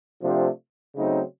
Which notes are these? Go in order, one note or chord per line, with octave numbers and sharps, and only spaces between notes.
C3 F3 A3 D4 G4
C#3 F#3 A3 C4 D#4